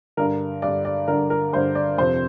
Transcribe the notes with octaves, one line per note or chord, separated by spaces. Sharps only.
G2 D3 A#4
G2 D3 D5
D5
G2 D3 A#4
A#4
G2 D3 C5
D5
F2 C3 C5